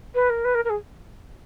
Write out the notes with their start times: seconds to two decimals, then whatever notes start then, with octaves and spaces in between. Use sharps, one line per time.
0.14 B4
0.29 A#4
0.44 B4
0.54 A#4
0.64 A#4
0.69 G#4